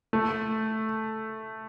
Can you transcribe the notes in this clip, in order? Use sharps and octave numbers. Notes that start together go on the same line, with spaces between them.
A3